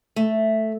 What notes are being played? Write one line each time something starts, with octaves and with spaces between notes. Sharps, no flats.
A3